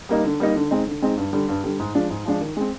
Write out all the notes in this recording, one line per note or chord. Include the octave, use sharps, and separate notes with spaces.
G3 A#3 D#4
D3
G3 A#3 D#4
D3
G#3 C4 D#4
D3
G#3 C4 D#4
G2
D3 G3
G2
D3 G3
G#2
F3 G#3 D4 F4
G#2
F3 G#3 D4 F4
D#3
G#3 C4